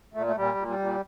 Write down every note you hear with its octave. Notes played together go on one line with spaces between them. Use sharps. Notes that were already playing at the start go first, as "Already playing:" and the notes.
A#2 A3
A3
A#2 G3
A#2
G3
A#2